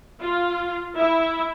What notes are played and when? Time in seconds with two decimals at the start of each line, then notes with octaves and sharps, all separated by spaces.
0.21 F4
0.95 E4 E5